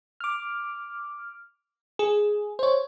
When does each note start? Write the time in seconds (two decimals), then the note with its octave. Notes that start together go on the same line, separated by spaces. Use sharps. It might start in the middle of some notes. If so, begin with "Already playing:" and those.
0.20 D6 F6
1.99 G#4
2.59 C5 C#5